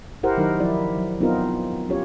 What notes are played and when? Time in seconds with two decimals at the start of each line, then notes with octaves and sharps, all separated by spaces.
0.23 E4 G4 A#4 C5 F#5
0.37 D#3 F#3 D#4 A#4
0.60 F3 E4 D5
0.97 F#3
1.20 B3 C4 D#4 F4 A#4
1.89 C#4 F4 G4 C#5